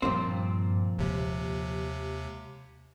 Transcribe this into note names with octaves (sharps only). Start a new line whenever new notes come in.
G2 A#2 F3 C4
D#2 C3 G#3